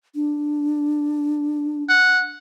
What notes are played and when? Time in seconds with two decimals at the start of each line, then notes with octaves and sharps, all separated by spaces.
0.15 D4
1.89 F#5